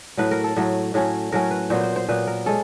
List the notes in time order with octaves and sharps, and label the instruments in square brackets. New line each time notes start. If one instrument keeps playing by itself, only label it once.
[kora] A2 F#3 A3 B4
A#4
A4
A2 F#3 A3
A2 F#3 A3 C#4
A2 F#3 A3 C#4 A#4
B4
A#2 F#3 B3 C5
C5
C5
A#2 F#3 B3 B4
A#4
G#3 C#4 A4